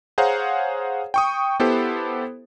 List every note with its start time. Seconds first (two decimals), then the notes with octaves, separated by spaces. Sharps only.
0.18 G#4 C5 C#5 F5 F#5 A#5
1.14 G5 C#6 D#6
1.60 B3 E4 G4 A4 C5